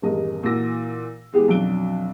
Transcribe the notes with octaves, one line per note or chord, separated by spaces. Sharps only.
D#1 E2 G2 A#4 D#5
A#2 E3 F#4 E6 A#6
E3 G#3 B3 G4 G#4
B1 F2 F#3 D4 D7 G7